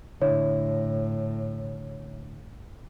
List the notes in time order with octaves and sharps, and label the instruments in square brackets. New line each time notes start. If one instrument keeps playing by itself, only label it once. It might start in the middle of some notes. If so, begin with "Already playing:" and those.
[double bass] A2 [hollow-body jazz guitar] D3 E4 [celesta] C#5